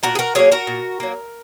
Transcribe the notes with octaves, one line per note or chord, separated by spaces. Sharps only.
A#2 F#4 A#4
G#4
F#4 A#4
F#3 A#3 G#4 C#5
F#4 A#4
A#2
F#3 A#3